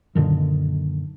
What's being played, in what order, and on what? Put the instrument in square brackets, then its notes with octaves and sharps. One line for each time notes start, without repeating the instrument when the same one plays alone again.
[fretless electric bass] F#2 A#2 D3 D#3